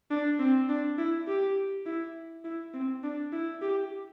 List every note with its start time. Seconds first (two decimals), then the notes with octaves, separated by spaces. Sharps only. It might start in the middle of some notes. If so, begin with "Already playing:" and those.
0.11 D4
0.39 C4
0.69 D4
0.98 E4
1.28 G4
1.86 E4
2.45 E4
2.74 C4
3.03 D4
3.33 E4
3.62 G4